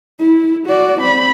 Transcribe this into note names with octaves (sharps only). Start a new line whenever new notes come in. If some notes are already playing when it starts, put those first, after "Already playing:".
E4
F#4 D5
C4 B5